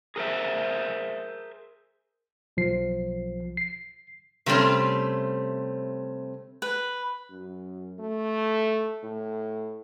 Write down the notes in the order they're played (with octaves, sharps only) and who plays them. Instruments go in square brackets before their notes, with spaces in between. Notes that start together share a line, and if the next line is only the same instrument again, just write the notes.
[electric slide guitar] G#4 A#4 C5 E5
[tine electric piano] B1 F3 C7
C7
[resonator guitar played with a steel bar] C3 G3 A3 C4 C#4
[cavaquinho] B4
[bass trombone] F#2
A3
A2